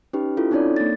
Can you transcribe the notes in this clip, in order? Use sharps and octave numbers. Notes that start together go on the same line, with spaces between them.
C#4 D#4 G4 B4
C#4 E4 F4 A4
C4 D4 D#4 A4 C#5 D5
A#3 A6